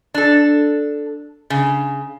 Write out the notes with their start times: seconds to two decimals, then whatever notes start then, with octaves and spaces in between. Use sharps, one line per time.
0.14 D4 A4
1.50 C#3